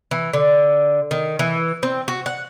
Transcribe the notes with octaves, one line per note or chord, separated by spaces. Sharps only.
E3
D3
D#3
E3
C4
F#4
F#5